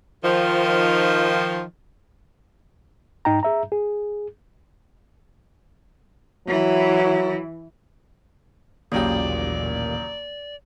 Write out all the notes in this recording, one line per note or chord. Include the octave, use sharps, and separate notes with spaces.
D#3 F3
G#2 D#4 G5 A#5
G#4 E5 A#5
G#4
E3 F#3 E4
A1 D#2 A#2 C#3 F#3 A#3 G4 D5